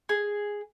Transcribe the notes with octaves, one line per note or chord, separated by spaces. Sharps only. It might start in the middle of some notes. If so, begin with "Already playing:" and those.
G#4